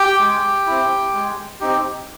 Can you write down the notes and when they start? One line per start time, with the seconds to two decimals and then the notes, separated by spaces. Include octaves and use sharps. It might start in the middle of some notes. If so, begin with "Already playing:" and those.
Already playing: G4 G5
0.19 G#3
0.67 C4 E4
1.14 G#3
1.60 C4 D#4 G4